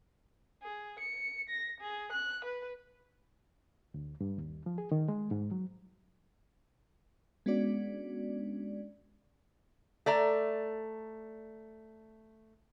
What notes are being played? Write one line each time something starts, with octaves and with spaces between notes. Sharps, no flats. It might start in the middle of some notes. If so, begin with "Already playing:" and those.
G#4
C#7
A#6
G#4
F#6
B4
D2
G2
D#2
F3
G#4
D#3
G#3
G#2
F#3
G#3 B3 C#4 D4 F#4 D5
A3 D5 A#5